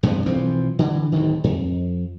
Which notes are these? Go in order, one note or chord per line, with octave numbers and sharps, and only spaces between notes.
E2 G2 C3 B3
B1 E3 F3 C4
D3 E3
D1 D2 D#3
F2